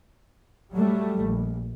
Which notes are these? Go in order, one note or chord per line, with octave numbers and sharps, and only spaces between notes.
F#3 G3 A3
A#1